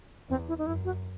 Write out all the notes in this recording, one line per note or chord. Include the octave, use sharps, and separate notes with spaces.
E2 C4
E4
D#4
F#2 E4
F#4